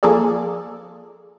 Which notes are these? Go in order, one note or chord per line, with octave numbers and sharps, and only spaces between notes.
F3 A#3 G#4 A4 D5